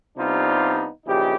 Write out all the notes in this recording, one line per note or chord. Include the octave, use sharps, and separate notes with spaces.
C3 G3 B3 D4 D#4 F4
A#1 C#3 E3 D#4 G4